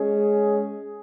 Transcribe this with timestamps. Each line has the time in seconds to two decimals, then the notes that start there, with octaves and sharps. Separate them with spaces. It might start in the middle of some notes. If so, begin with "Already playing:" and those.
Already playing: G#3 C#4 G#4